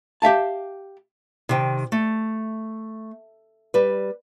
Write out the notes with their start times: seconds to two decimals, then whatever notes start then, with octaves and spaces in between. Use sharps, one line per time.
0.22 G4 E5 F5 A5
1.49 C3 D#3 G5
1.92 A3
3.74 G3 B4